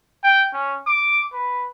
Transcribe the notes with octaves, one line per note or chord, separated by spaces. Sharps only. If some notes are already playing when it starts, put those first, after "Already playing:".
G5
C#4
D6
B4